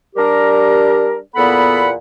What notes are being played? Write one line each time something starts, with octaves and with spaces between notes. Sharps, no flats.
G3 D4 G4 A#4
E2 A#2 B3 A4 F#5 B5